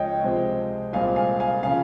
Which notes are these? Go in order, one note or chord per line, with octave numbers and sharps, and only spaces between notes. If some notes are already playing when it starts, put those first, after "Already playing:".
Already playing: C#2 F3 C#5 D#5 G5
C3 F3 G#3 C4
C2 A#2 G#3 C4 F5 G#5
F5 G#5
F5 G#5
C#3 F3 F5 G#5